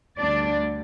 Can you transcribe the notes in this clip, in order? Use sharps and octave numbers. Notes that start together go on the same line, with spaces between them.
D2 D3 G3 D4 D5